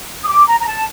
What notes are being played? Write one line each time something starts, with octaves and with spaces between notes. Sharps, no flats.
D#6
D6
A#5
A#5
A5